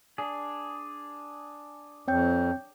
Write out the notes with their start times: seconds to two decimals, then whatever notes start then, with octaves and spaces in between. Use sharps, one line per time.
0.18 D4 G#4
2.08 F2 C4 C#5 G5 G6